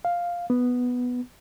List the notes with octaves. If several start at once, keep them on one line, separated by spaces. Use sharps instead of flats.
F5
B3